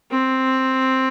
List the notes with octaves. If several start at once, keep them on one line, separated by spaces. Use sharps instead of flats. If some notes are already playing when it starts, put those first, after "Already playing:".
C4